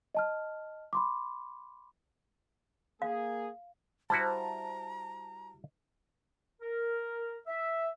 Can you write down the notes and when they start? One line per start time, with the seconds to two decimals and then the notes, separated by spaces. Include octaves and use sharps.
0.15 D#5 A5 F6
0.93 B5 C6 D6
3.02 A#3 G#4 F5
4.10 G3 E4 F#4 B4 C5 A5 A#5
6.61 A#4
7.47 E5